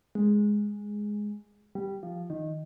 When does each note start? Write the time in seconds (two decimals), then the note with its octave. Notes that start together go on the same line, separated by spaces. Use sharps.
0.15 G#3
1.75 G3
2.03 F3
2.30 D#3